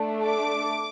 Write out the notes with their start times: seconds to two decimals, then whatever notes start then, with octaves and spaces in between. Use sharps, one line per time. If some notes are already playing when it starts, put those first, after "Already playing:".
Already playing: A3 D4 A4
0.24 D6